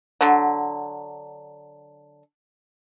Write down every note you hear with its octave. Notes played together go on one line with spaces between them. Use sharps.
D3 F#3